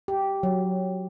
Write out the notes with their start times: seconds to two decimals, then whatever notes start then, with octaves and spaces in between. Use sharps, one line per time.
0.08 G4
0.43 F#3